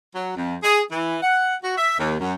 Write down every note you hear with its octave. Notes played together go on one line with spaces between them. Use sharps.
F#3
F2
G#4
E3
F#5
F#4
E5
D#2
F#2